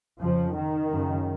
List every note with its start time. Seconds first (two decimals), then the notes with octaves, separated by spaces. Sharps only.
0.20 F2 C#3 F3
0.55 D#3
0.91 F#2 C#3